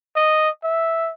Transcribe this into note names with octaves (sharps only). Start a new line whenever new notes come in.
D#5
E5